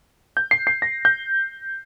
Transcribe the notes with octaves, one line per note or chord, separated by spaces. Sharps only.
G6
C7
C7
A#6
G6